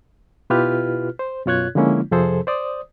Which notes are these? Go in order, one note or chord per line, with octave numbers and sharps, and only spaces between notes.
B2 E4 F4 G4 B4 F6
C5
F#2 B2 F4 C#5 F#6 G#6
D3 F3 G#3 A#3 C#4 E4
F2 C3 F3 G#4 A4 C5
C5 D5 D#6